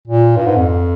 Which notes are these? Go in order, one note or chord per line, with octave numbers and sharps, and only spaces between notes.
A#2
G2
G#2
F2